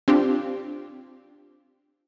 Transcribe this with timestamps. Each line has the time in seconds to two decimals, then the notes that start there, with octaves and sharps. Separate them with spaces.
0.08 C4 D4 F4 G4